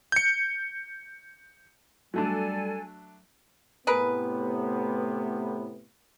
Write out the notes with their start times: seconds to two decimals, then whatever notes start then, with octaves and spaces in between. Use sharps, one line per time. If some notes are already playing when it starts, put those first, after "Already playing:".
0.12 G6 C#7
2.14 F#3 G3 A3 D4 A4 G#5
3.87 A2 C3 B3 G#4 A#4 B4